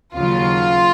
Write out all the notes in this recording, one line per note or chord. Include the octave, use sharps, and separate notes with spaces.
D#2 C#3 F#3 F4